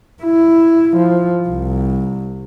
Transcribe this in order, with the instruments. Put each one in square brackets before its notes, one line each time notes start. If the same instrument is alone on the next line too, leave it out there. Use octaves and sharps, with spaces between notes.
[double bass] E4
F3
C2